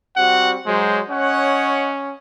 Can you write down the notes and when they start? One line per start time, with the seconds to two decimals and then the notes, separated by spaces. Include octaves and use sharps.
0.16 G3 C4 F#4 F#5
0.66 F#3 G#3 C5
1.10 C#4 C#5 D#5 F#5